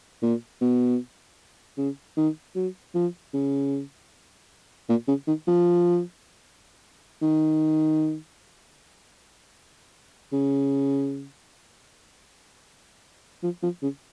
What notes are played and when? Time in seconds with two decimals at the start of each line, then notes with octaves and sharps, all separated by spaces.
0.22 A#2
0.61 B2
1.77 C#3
2.17 D#3
2.55 F#3
2.95 F3
3.33 C#3
4.89 A#2
5.08 C#3
5.27 D#3
5.48 F3
7.22 D#3
10.32 C#3
13.43 F3
13.63 F3
13.82 C#3